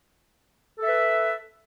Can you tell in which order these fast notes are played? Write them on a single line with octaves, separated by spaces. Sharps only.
A4 E5 B4